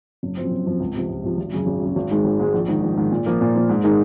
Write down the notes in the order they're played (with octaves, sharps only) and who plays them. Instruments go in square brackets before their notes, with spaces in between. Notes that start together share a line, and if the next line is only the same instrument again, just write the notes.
[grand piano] F#1
F#2 F3 C4
F#1
F#2 F3 C4
C#2
C3 F3
C#2
C3 F3
G#1
F#2 C#3
G#1
F#2 C#3
G#1
G#2 D#3 G#3
G#1
G#2 D#3 G#3
A#1
G#2 D#3
A#1
G#2 D#3
A#2
F3 A#3
A#2
F3 A#3
G#2
D#3 G#3 D#4 A#4